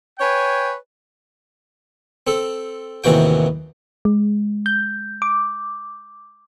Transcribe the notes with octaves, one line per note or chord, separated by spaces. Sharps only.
B4 C#5 G5 G#5
C4 A4
A1 D#2 C3 E3 F#4 G5
G#3
G6
D6